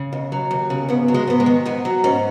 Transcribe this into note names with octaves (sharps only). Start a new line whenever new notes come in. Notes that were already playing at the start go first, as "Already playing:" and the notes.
Already playing: C#3
D#2
F#3
D#2
C#3
G#2 B3
F#3
G#3
G#2 B3
G#3
D#3
G#2 B3
F#3
G#2 C#4